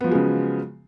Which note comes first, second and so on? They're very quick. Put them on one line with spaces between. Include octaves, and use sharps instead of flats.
B3 F3 F#3 G#3 C#3